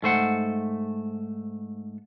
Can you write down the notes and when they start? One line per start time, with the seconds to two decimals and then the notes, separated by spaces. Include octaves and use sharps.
0.03 G#2 A3 C5 F#5